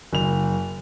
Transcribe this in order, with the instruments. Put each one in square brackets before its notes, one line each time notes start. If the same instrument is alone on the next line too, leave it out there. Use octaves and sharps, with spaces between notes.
[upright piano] F#1 F7